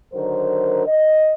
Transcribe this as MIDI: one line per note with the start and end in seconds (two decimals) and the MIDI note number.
0.13 0.85 50
0.13 0.85 51
0.13 0.85 54
0.13 0.85 70
0.13 0.85 72
0.87 1.33 75